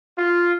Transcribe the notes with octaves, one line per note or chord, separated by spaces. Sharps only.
F4